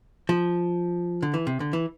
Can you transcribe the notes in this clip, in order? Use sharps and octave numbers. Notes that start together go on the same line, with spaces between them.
F3
D3
E3
C3
D3
E3